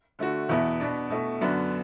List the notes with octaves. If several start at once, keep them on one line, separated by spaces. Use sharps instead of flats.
D3 A3 F#4
E2 B2 B3 E4
B2 B3 D4
B2 A3 E4
F#2 D3 B3 D4 F#4